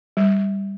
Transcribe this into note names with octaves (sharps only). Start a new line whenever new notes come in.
G3